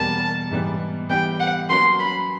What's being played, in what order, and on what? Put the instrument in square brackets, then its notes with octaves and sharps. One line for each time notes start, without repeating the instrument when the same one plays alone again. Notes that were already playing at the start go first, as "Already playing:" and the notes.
Already playing: [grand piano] E2 B2 G3 A#3 [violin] A5
[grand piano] G#2 E3 G3 B3
[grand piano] E3 G3 B3 D#4 G4 [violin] G5
[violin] F#5
[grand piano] F#3 A#3 C#4 F#4 B4 [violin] C6
[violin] B5